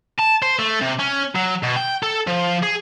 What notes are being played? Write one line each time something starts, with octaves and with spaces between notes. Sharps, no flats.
A5
C5
A3
C3
C#4
F#3
B2
G5
A4
F3
G#4